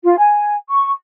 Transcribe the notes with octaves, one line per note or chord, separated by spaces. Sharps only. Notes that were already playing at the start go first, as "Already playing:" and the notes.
F4
G#5
C#6